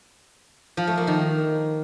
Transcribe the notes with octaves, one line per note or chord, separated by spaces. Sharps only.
F3
A3
A#3
D#3